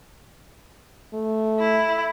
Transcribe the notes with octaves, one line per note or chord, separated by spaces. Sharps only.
A3
E4